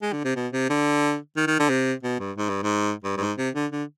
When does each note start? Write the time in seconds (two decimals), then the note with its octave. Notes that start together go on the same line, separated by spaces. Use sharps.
0.02 G#3
0.12 D3
0.24 C3
0.36 B2
0.53 C3
0.69 D3
1.37 D#3
1.47 D#3
1.59 D3
1.70 C3
2.03 B2
2.20 G2
2.38 G#2
2.49 G2
2.63 G#2
3.04 G2
3.17 G2
3.20 G#2
3.37 C3
3.55 D3
3.72 D3